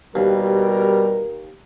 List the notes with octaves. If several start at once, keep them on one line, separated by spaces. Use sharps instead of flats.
D#2 B2 G3 A#4